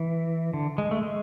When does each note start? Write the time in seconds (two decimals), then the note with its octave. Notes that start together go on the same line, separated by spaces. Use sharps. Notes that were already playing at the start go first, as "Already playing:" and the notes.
Already playing: E3
0.54 D3
0.78 G#3
0.91 A3
1.03 G#3